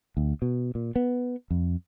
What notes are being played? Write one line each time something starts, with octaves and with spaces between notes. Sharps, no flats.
D2
B2
A#2
B3
F2